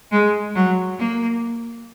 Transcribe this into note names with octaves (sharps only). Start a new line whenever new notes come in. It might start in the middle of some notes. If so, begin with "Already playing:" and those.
G#3
F#3
A#3